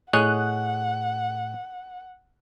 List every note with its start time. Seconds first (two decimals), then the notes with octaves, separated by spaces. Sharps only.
0.13 A2 G#4 C#5 D#5 F#5 F#6